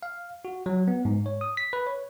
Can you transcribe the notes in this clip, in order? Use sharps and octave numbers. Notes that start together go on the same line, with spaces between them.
F5
F#4
F#3
B3
G#2
C#5
D#6
B6
B4
C#5